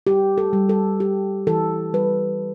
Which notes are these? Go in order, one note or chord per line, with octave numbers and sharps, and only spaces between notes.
G3 G4
A4
G3
A4
G3 G4
E3 A4
G3 B4